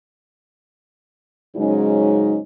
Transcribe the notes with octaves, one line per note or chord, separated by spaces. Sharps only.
G#2 C#3 F#3 G#3 C#4 D#4